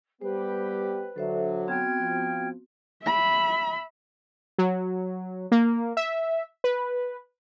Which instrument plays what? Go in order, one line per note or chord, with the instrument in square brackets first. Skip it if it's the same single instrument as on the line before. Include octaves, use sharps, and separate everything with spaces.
[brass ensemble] G3 B3 G4 [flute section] B4 [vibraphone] C5
[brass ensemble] D3 F#3 [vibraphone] A4 C5 E5
[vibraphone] B3 C4 F#4 [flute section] G5 F6 G#6
[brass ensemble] F3
[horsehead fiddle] E5 B5
[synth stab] F#3
A#3
E5
B4